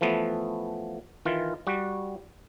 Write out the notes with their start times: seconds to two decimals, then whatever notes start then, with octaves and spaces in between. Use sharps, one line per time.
0.01 E3 F3 A3 B3
1.25 D#3 E3 F4
1.67 G3 F#4